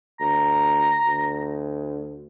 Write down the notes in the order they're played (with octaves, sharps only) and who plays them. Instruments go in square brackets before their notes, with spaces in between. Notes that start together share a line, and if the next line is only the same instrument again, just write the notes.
[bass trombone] D2 [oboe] A#5
[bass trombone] D2